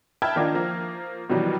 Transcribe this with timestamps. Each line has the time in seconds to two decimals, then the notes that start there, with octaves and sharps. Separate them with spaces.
0.22 E5 G5 A5 B5 F6 G#6
0.36 D#3 A#3 D4 D#4 F4
0.54 F3 A#3
1.29 B2 D#3 E3 F#3 G3